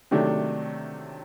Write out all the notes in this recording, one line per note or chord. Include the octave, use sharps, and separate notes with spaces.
C3 D#3 F#3 A3 D4